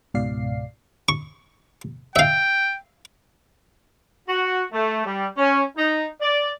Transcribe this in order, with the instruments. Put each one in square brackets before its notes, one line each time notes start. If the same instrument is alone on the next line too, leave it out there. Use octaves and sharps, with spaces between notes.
[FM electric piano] C#2 G#2 B2 D5 F5 C7
[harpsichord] C#6
[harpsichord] E5 F5 [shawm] G5
[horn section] F#4
A3
G3
C#4
D#4
D5